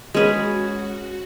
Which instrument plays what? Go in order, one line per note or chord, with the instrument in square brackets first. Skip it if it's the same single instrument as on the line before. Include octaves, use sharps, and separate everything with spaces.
[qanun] G#3 C#4 G#4 B4 [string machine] F#4